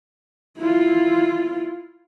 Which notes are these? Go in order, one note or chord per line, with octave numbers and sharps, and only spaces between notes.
E4 F4